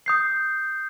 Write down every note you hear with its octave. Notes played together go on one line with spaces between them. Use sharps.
D#6 G6 C7